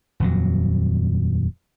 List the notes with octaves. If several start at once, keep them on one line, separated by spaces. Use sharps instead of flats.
D#1 F2 F#3